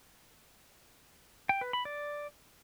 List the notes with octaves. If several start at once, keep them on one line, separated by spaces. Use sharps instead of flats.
G5
B4
B5
D5